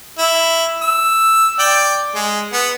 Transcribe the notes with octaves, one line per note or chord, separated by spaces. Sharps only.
E4
E6
D5 G5
G#3
B3